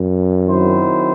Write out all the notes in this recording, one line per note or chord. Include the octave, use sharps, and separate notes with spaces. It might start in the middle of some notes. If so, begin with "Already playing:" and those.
Already playing: F#2
D#3 F#3 C4 E4 C5